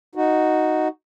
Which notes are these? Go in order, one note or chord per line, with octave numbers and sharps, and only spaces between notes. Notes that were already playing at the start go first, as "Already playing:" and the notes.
D#4 F#4